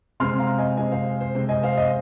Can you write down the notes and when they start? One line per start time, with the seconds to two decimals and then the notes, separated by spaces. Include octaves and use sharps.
0.20 C3 G#3 C4 C6 F6
0.39 F5 A#5
0.58 D#5 G#5
0.77 C3 G#3 C4 D#5 G#5
0.92 C5 F5
1.21 C5
1.35 C3 G#3 C4
1.49 D#5 G#5
1.63 C5 F5
1.77 D#5